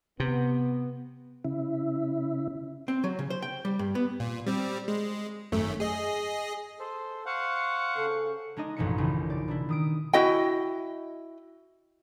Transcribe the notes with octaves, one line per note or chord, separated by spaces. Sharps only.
C3 B3
C#3 E4
C4
F#3
C#3
C5
G5
G3
G2
B3
A#2
G3 C4
G#3
G#1 F#2 A3
G#4 D#5
A4 C5
C5 F5 F#5 C#6
C#3 A4
G#3 D4 D#4 D#5
A1 F#2 B2 F3 D#4 C#7
A#1 D#2 C#3 E3
D5
B2 D4 E4
D#3 D#6 D7
E4 F#4 D#5 G5